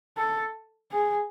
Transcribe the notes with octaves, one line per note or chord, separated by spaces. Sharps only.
A4
G#4